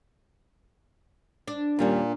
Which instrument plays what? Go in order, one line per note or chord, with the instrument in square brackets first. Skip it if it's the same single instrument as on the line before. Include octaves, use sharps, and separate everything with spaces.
[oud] D4
[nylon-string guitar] D#2 G3 C#4 [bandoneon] A#2